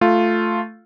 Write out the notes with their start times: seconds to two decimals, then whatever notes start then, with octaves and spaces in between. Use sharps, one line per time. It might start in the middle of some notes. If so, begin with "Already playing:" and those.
0.01 A3 F4